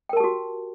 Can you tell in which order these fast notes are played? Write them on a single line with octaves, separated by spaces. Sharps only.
G5 A#4 A5 G4 F#4